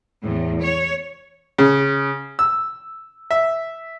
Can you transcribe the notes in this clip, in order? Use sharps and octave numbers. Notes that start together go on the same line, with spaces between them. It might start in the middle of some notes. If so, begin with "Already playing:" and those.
E2 A2
C#5
C#3
E6
E5